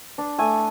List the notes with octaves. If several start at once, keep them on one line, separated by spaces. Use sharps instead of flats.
D4
A3 G#5